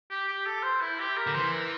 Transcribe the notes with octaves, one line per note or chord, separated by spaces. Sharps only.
G4
G4
A4
C5
E4
G4
A#4
D3
E3 C5
A#4